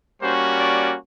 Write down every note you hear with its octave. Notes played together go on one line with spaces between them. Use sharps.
G3 A#3 C#4 F#4 C5
D5